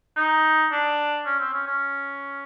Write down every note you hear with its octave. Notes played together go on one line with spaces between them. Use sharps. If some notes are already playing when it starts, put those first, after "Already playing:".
D#4
D4
C#4
C4
C#4
C#4